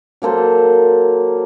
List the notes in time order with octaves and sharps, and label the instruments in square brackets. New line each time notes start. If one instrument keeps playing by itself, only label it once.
[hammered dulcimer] F#3 A#3 A4 C5